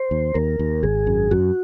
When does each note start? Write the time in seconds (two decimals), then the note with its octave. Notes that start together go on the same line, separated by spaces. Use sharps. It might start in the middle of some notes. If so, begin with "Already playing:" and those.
Already playing: C5
0.11 D#2
0.34 D#2 A#4
0.59 D#2
0.83 G#1 G#4
1.07 F#2
1.31 F#2 F#4